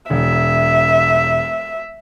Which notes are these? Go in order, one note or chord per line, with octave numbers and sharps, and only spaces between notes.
E1 E5